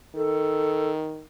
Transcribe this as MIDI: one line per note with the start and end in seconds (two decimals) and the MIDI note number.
0.15 1.24 51
0.15 0.89 69